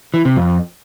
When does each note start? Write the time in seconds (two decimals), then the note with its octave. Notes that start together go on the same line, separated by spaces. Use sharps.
0.14 E3
0.25 C3
0.37 F2